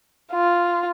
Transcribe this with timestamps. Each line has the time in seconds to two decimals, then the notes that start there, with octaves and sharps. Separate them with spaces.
0.32 F4